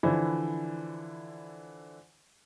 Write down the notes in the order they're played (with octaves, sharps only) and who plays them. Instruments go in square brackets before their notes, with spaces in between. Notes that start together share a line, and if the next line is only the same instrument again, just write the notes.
[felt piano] D3 E3 F3 D4 E4 C5